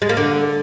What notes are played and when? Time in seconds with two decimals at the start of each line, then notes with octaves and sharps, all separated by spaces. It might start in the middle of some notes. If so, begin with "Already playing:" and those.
0.02 G#3
0.09 A#3
0.17 D3